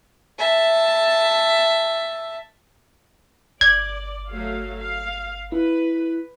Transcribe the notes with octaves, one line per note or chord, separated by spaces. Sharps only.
E5 A5
G1 D5 G#6
F#3 A3 F5
F5
E4 B4